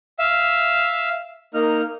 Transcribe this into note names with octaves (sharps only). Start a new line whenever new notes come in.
E5 F5 E6
A#3 D#4 F6